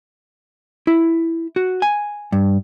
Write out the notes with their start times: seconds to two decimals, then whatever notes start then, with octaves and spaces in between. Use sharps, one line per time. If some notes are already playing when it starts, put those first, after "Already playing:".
0.87 E4
1.56 F#4
1.82 G#5
2.32 G2